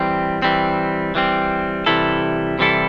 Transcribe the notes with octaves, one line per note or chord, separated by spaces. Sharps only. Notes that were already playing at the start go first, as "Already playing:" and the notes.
Already playing: E3 G3 C4
E3 G3 C4
E3 G3 C4
C3 E3 G3 E4 A4
C3 E3 G3 E4 A4